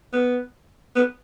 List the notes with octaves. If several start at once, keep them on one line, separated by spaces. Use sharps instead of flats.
B3
B3